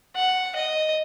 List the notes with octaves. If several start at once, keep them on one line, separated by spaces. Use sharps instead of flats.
F#5
D#5